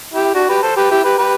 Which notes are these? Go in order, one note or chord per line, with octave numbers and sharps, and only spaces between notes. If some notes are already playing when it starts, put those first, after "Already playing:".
E4 G4
D4 F#4
G4 B4
A4 C5
G4 B4
E4 G4
G4 B4
G4 B4